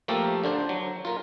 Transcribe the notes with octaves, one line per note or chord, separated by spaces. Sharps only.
F3 A3 A#3 G4 A4 A#4
D3 D4 C5
F#3
F4 A#4